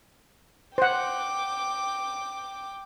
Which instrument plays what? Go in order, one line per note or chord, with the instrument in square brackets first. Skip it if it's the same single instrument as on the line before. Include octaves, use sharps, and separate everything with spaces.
[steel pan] C5 F#5 [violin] G5 D6